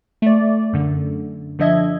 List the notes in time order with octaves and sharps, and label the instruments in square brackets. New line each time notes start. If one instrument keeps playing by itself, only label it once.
[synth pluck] A3 D5
F#2 D3
D3 F3 D4 D#5 E5 G#6